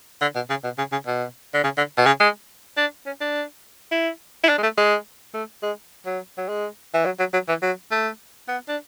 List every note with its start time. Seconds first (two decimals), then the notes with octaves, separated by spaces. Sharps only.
0.21 D3
0.35 B2
0.50 C#3
0.64 B2
0.78 C#3
0.92 C#3
1.06 B2
1.54 D3
1.64 C#3
1.77 D3
1.97 B2
2.06 C#3
2.20 G#3
2.77 D4
3.06 C#4
3.21 D4
3.91 E4
4.43 E4
4.49 D4
4.58 G#3
4.63 A3
4.78 G#3
5.34 A3
5.63 G#3
6.05 F#3
6.37 F#3
6.48 G#3
6.94 E3
7.05 F#3
7.19 F#3
7.33 F#3
7.48 E3
7.62 F#3
7.91 A3
8.48 B3
8.68 D4